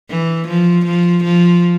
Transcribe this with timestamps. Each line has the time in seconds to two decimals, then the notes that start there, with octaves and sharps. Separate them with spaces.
0.10 E3
0.48 F3
0.86 F3
1.24 F3